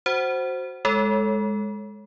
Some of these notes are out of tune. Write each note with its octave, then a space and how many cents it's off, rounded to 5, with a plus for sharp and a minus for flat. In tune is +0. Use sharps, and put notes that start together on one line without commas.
F#4 +0 C5 +0 F#5 +25
G#3 +0 A4 +0 C#5 +0